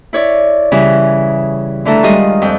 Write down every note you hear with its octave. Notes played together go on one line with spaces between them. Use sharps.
E4 C#5 D5
C#3 E3 G3 C#4
D3 E3 A3 A4 A#5
D#3 G3 G#3 F4 D#5
F2 G5